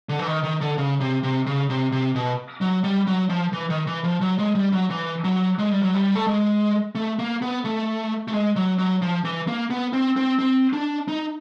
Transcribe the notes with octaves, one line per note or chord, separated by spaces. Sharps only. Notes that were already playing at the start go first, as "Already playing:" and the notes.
D3
E3
D#3
D#3
D3
C#3
C3
C3
C#3
C3
C3
B2
F#3
G3
F#3
F3
E3
D#3
E3
F3
F#3
G#3
G3
F#3
E3
F#3
G#3
G3
F#3
G3
A3
G#3
A3
A#3
B3
A3
A3
G#3
F#3
F#3
F3
E3
A#3
B3
C4
C4
C4
D4
D#4